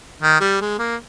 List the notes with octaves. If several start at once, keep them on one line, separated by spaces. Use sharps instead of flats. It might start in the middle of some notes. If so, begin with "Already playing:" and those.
D#3
G3
G#3
A#3